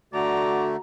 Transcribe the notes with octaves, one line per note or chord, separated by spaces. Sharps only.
D3 A3 F#4 D5 A#5